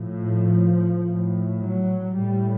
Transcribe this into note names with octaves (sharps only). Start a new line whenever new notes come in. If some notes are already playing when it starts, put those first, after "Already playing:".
Already playing: A2 F3
A2
F#3
A2 G3